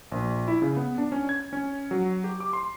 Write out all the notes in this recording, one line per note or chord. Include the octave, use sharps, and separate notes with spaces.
A#1
E4
C#3
B3
D4
C#4
G#6
C#4
F#3
G4
D6
C6